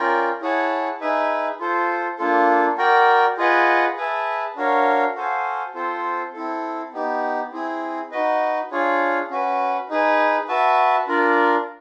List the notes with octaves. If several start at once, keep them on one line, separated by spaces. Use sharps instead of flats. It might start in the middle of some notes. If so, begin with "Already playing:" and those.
Already playing: C#4 F4 A#4 D5 G5
E4 G#4 C#5 F#5 A5
D#4 G#4 B4 E5
F4 A4 C5
A#3 D4 F4 A4
F#4 A#4 D5 G5
F4 G#4 B4 D#5 F#5
G#4 B4 E5 A5
D4 F#4 A#4 C#5 F5
F#4 A4 C5 F5 G#5
C4 F4 A4 C5
C4 E4 A4
B3 D#4 G4
C4 E4 G#4
D#4 F#4 B4 D#5
D4 F4 G#4 C#5 F5
C#4 F#4 B4
D#4 G#4 B4
F#4 B4 E5 A5
D4 F4 A#4 D5